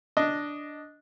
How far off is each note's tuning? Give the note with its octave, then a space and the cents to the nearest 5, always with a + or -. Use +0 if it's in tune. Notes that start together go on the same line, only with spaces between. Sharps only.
D4 +0 D#5 +0